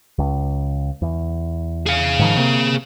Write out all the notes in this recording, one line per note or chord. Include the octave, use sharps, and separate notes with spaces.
C#2
E2
G#4 F5
G#2 D#3 F3
C3 A#3